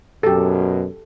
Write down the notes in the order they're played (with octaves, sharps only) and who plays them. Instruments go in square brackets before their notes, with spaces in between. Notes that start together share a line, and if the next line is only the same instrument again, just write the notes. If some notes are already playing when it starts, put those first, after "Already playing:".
[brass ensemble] F#2 B2 [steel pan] G4 A4